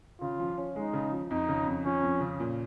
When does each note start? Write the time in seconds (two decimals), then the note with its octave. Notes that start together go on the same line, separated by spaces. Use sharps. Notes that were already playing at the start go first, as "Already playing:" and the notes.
0.21 C#3 F4
0.39 F3
0.58 C#4
0.76 G#3 D#4
0.93 C#3
1.12 F3
1.30 F2 D#4
1.49 C#3
1.67 F2
1.85 F3 C#4
2.03 F2
2.20 C#3
2.40 A#2